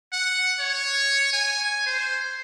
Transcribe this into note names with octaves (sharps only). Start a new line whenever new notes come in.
F#5
C#5
G#5
C5